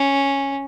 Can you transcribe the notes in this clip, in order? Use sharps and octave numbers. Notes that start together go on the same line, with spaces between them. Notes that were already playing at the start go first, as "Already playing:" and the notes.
Already playing: C#4